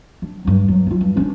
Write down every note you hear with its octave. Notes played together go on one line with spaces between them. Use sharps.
D4
G2 F#3
G2 F#3
C4 F4
G2
C#4 D4